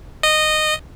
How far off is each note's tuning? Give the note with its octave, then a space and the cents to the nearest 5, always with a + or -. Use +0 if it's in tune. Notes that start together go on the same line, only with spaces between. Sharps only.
D#5 -15